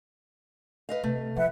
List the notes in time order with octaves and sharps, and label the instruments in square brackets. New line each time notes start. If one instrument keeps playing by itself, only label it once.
[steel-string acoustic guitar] B4 D#5 F5
[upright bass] C3 [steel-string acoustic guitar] A3
[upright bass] F3 [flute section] B4 E5 F#5